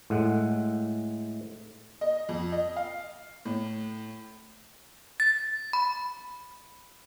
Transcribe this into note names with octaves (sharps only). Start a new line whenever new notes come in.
A2 G#3 F#5
D#5
F2
D#5
F5
A2
A6
B5